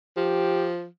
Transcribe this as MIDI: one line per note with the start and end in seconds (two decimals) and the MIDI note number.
0.17 0.86 53
0.17 0.68 67